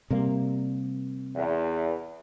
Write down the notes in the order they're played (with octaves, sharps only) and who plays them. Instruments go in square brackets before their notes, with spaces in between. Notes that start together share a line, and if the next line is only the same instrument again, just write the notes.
[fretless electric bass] C3 G3 A#3
[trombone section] E2